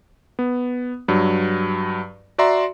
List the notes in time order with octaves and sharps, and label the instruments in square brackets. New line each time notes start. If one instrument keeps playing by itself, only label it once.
[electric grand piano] B3
G2 F#3
F#4 D5 E5 A#5 C6